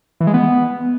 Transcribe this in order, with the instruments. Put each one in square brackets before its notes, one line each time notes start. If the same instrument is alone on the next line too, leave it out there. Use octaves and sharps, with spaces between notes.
[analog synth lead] E3
G#3
B3